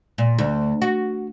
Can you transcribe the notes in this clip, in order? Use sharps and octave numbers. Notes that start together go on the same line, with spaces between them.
A#2
D2
F#4